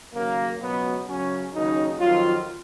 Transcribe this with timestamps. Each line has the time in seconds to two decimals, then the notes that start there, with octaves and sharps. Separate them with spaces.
0.14 D#2 C#3 F#3 A#3
0.60 C#2 B2 F#3 B3
1.07 F#2 C#3 F#3 C#4
1.53 D#2 C#3 F#3 D#4
1.99 F2 D#3 F#3 F4